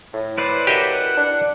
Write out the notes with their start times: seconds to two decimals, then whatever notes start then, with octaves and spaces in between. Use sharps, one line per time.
0.13 A2
0.38 E4 B4 C5 D5
0.67 F#2 G4 D#5 E5 F#5
1.17 D4